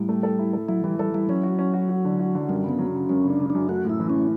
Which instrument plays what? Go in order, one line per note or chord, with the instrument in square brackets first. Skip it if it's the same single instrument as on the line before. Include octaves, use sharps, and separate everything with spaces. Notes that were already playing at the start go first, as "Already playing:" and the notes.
Already playing: [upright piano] A2 [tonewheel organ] G3
[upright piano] A3
A4
E4
A4
[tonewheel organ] F#3 [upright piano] E4
[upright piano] E3 [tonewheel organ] G3
[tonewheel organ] G3 [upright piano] A4
[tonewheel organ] G3 [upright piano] E4
[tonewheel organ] F#3 [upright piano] C#4
[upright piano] F#4
C#4
F#4
F#4
D3
F#4
D3
[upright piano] F#2 [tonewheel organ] G3
[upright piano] C#3
[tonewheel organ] B3
[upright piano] F#3
C#3
[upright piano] F#2 [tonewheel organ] C#4
[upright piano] C#3
[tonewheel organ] D4
[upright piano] C#3
[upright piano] F#2 [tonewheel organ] D4
[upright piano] A3 [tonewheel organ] F#4
[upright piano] A2 [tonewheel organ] E4
[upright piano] E3
[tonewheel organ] C#4
[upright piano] A2